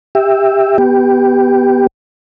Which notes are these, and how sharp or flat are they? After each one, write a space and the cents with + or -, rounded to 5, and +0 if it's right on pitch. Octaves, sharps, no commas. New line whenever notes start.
G4 +15 E5 +0
B3 +0 G4 +0